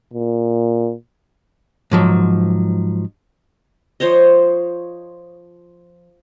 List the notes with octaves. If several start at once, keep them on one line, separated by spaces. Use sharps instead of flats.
A#2
G#2 F3 F#3
F3 C5 C#5 D#5